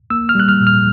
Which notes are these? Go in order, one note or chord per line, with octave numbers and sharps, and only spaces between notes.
A#3 E6
F6
G3 F#6
F6
A#2
F6